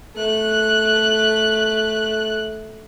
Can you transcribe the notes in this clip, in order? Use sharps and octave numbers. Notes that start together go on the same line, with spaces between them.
A3 F#6